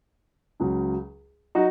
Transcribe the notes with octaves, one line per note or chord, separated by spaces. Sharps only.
C#2 C#3 F#3
F#3 D#4 F#4